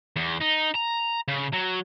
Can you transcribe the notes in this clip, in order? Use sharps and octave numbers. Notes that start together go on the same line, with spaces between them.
E2
D#4
A#5
C#3
F#3